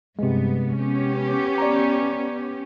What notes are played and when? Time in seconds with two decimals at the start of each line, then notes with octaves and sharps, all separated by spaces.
0.19 G2 C3 G#3 B3
0.78 B3 C#4 G4
1.58 D5 A#5